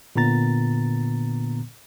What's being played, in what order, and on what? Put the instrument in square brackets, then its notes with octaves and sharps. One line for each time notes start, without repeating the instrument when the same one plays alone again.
[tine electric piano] A#2 D3 B3 A#5 A6